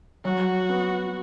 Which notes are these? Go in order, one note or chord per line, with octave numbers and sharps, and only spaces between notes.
F#3 F#4
B3